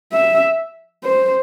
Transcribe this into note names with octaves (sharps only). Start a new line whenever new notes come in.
E5
C5